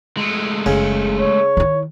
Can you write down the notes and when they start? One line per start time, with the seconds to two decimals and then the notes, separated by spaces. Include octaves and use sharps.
0.17 G#3 A3
0.66 F#1 C#3
1.20 C#5
1.57 D#3 E4